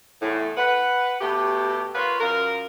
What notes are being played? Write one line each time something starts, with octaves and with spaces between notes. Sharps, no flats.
E2 A2
B4 F#5
B2 A3 G4
F4 A#4 B4 C#5 F5
F#2 F4 A#4